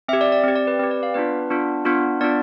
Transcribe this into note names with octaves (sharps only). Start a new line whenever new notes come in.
C4 G4 E5
D5
D5
C4 G4
D5
B4
C4 G4 B4
D5
F5
B3 D4 F4 B4
B3 D4 F4
B3 D4 F4
B3 D4 F4 D5